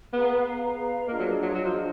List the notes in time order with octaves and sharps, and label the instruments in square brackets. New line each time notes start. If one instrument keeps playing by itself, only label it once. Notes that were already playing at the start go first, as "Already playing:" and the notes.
[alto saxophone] B3 [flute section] G#4 B4 F5 A#5
[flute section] G#4 B4 F5 A#5
[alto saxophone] A#3 [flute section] D4 F4 G#4 D#5
[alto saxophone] F#3
F#3
[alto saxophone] F#3 [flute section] D4 F4 G#4 D#5
[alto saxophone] F3